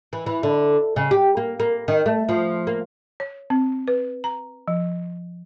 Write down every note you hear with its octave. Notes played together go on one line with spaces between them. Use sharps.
E3
E3
D3
C#3
G4
A#3
A#3
D#3
A3
F3
A#3
C#5
C4
B4
A#5
F3